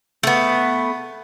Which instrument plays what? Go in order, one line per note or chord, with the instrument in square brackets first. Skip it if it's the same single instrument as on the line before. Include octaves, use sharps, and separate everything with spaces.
[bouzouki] A3 B3